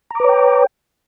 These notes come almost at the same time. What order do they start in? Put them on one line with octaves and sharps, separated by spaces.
A#5 D6 B4 C#5 G5